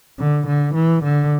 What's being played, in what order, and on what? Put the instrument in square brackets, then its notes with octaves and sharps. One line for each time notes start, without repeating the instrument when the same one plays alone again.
[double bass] D3
D3
E3
D3